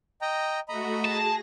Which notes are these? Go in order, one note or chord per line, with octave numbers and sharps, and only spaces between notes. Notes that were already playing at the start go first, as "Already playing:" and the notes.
D#5 G5 A#5
A3 F#4 D#5 A#5 B5
G#4 A5 A#6